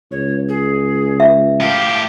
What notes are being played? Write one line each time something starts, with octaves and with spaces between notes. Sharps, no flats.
C#2 C#5
G#4
E5
A2 G4 F5